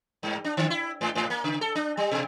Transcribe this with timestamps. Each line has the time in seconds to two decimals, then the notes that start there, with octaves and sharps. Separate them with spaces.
0.23 G2
0.45 D4
0.57 D3
0.70 E4
1.01 G#2
1.15 G#2
1.30 A#3
1.44 C#3
1.61 A4
1.75 D4
1.97 G3
2.11 B2